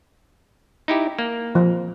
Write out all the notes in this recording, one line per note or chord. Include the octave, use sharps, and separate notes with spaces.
D#4 E4 G4
A#3
F3